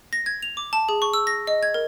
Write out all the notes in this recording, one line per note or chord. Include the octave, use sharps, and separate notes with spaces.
A#6
G#6
F7
D6
A5
G#4
C#6
E6
A#6
D#5
G#6
A#4